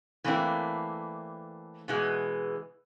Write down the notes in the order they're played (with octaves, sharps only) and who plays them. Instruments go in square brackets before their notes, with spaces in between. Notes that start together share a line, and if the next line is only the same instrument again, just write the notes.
[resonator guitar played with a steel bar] E3 A3 A#3 C4 D4 E4
B2 E3 G#3